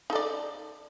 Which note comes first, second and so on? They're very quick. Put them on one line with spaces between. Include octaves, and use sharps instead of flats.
D#4 A4 D5